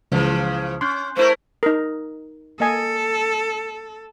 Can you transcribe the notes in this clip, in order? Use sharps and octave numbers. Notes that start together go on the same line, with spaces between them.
C#2 C#3 E3 F3
C#4 C6 F#6 G6
A3 E4 A#4 C5
D#4 A#4
A#3 A4 D#5 G#5